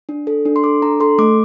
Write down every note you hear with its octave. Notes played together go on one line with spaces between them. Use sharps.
D4
A4
D4
C6
A4 D6
D4 A#5
A4 C6
A3 D6